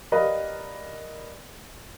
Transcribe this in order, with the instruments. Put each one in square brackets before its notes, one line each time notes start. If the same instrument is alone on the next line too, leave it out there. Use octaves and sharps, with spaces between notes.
[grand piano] G4 A#4 B4 D5 D#5 F5